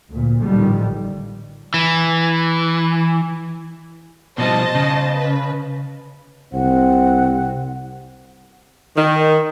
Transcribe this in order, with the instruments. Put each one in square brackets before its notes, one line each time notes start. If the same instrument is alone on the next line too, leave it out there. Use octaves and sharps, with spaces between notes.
[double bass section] D2 A#2
A1 D3 D#3 F3 G3
[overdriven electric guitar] E3
[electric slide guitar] B2 F3 G3 [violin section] C5 D#5 A5
[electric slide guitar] C#3
[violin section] B4
[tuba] C2 [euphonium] C4 [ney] F#5
[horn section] D#3